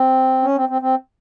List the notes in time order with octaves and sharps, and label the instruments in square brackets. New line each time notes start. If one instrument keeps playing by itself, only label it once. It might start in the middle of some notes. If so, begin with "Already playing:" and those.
Already playing: [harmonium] C4
C#4
C4
C4
C4